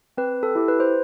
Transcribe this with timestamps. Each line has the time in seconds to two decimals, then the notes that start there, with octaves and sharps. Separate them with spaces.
0.18 C4 B4
0.43 A4
0.55 E4 G4
0.68 B4
0.80 C5